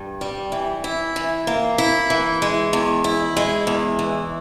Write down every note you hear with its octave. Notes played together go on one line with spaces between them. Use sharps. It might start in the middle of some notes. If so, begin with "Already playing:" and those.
Already playing: G2
G3
E3
E4
E3
A#3
E4
E3
G#3
E2
E4
G#3
E2
E3